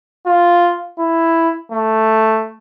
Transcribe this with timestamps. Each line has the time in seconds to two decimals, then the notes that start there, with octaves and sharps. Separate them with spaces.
0.27 F4
0.99 E4
1.72 A3